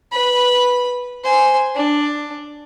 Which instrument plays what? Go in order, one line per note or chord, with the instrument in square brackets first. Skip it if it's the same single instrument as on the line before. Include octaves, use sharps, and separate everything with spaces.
[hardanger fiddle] B4 B5
C5 G#5
D4